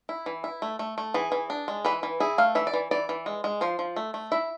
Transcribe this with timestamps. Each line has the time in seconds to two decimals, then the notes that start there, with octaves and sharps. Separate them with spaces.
0.09 E4
0.26 E3
0.44 E4
0.62 A3
0.79 A3
0.98 A3
1.14 E3 G#4
1.32 E3
1.50 D4
1.68 G#3
1.85 E3 B4
2.03 E3
2.20 E4 G#4
2.38 A3 F5
2.55 E3 E5
2.67 D5
2.73 E3
2.91 E3 D5
3.09 E3
3.26 G#3
3.44 G#3
3.61 F3 C5
3.79 F3
3.96 A3
4.14 A3
4.32 E4 E5